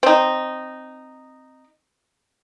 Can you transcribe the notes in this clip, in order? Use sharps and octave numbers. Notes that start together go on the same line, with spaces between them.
C4 D#4